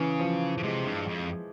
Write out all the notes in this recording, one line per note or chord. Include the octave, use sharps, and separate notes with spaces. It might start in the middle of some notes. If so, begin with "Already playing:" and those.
Already playing: C#3 E3
F3
C#3
C3 G#3
G2
F2